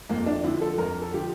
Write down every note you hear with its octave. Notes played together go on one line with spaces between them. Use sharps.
F2 A#3
D4
D3 F3 E4
A4
F2 A#4
A4
D3 F3 G4